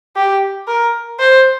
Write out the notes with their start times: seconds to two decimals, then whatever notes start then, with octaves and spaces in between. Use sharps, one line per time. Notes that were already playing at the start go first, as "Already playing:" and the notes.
0.16 G4
0.68 A#4
1.20 C5